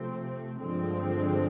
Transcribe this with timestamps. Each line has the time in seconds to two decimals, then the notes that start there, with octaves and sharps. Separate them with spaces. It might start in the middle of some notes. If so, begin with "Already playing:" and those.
Already playing: C3 F3 A3 C4
0.62 G2 D3 F3 G#3 C4